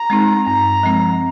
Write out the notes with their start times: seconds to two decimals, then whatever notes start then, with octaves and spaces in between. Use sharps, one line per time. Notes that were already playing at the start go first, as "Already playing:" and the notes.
Already playing: A#5
0.10 G#3 C4 D#4
0.46 G2 A#5
0.83 F3 G#3 C4